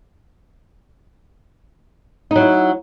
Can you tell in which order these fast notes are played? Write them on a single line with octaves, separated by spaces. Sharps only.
D#4 F#3 E4